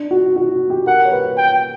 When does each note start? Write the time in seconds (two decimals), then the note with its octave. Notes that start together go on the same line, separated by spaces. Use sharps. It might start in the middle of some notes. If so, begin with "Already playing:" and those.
Already playing: D4
0.11 F#4
0.36 F#4
0.70 G4
0.87 A#4 F#5
1.05 C#5
1.12 B4
1.37 G5